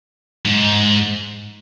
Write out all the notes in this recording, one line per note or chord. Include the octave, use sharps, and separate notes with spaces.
G#2